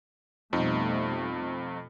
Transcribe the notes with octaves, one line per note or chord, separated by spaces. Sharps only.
F2 B2 G3 A3 D#4